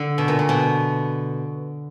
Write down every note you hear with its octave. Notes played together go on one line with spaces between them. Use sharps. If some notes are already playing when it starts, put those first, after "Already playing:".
Already playing: D3
B2
A#2
A#2
B2